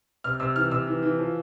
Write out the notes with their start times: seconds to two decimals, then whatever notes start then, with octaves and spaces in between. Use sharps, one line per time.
0.24 C3 F6
0.40 C3 E6
0.56 E3 F6
0.71 C3 E6
0.87 E3
1.03 E3
1.19 F3